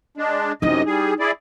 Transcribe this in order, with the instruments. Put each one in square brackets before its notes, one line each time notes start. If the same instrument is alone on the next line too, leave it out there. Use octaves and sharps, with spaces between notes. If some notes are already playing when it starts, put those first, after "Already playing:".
[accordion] G#3 D4
[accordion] F#2 C3 D#5 [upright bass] D#4 E4
[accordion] G3 G#4
E4 G#4 D5